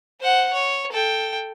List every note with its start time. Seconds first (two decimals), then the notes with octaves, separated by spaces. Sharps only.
0.21 C5 F#5
0.53 C#5
0.92 A4 G5